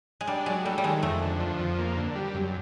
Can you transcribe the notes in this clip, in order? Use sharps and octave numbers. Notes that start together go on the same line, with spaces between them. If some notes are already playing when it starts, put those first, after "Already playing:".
G#3
G3 D4
F#3 G#3
G3 A3
G3
D#3 G#3
F2 A3
D3
F3
F2
A#3
D3
G3
F#2